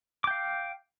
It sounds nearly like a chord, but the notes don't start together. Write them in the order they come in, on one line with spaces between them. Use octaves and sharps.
D6 G5 F5